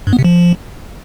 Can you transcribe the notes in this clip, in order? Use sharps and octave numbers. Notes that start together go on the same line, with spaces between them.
G2
B3
C3
F3